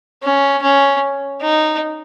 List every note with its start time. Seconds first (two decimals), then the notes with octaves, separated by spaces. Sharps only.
0.23 C#4
0.62 C#4
1.41 D#4